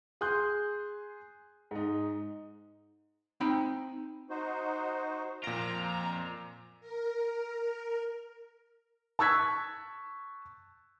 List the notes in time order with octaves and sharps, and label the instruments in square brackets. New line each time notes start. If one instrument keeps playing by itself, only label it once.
[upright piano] G#4 C6 D#6 F#6 G6
G#2 D#4
[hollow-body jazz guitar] C4 D#4 G5 B5
[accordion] D#4 F#4 C5
[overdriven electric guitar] F2 F4 [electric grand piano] A#2 D7 [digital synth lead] A#5
[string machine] A#4
[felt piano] A5 C#6 E6 F#6 G#6 B6